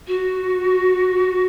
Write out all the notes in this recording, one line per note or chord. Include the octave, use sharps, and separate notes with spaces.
F#4